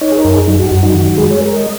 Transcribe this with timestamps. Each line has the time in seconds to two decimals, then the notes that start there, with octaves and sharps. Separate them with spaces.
0.01 D#4 C#5
0.12 G#4
0.17 A#4
0.25 F#2
0.33 G#4
0.47 F#3 D#4
0.60 F#4
0.71 F#2 F#4
0.83 D#4
0.94 D#3 F#4
1.17 G#3 G#4
1.31 C#5
1.41 G#3 A#4
1.56 D#5